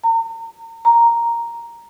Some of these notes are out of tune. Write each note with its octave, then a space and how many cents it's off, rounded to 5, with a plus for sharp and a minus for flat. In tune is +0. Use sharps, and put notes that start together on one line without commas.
A#5 -40
A#5 +0